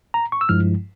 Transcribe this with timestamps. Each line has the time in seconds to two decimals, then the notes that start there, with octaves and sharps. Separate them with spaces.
0.14 A#5
0.32 C#6
0.41 E6
0.49 G2 F3 G#3 E4 F6